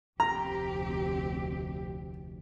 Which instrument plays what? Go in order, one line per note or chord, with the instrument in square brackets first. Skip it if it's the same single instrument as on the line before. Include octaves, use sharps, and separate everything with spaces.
[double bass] F1 D2 [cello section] C4 G4 [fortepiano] A#5